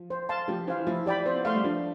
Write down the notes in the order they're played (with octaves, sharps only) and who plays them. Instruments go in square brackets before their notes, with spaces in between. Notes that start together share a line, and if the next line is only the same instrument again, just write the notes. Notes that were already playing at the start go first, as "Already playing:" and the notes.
Already playing: [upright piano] F3
[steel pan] C5
F5 A5 C6
[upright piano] F3 [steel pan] G4
[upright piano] E3 [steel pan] C5 F5
[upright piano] F3 [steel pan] E4
[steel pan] G4 D5 G5 B5
[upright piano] C4 [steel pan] C5
[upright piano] B3
[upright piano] A3 [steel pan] F5 C6
[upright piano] G3
[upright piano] F3 [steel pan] D4